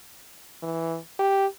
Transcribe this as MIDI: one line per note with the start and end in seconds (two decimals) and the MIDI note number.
0.63 0.97 52
1.19 1.46 67